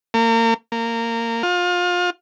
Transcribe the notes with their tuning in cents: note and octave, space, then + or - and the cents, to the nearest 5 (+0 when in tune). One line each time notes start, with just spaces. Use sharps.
A#3 -35
A#3 -20
F4 +30